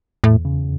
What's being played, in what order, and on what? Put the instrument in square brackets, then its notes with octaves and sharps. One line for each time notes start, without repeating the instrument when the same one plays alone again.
[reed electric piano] E2 [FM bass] A2
[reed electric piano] C#3